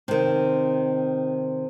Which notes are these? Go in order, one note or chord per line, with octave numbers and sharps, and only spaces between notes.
C3 D#3